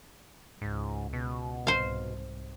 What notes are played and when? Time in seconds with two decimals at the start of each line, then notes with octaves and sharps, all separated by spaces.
0.62 C#2 G#2
1.13 B2
1.67 C2 G#2 C5 F5